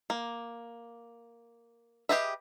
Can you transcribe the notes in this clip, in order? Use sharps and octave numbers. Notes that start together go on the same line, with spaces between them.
A#3
G4 G#4 B4 D#5 E5